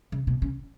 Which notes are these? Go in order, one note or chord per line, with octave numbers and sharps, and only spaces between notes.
C#3
B2
C#3